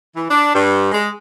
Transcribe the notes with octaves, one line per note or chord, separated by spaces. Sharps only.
E3
D4
G2
G#3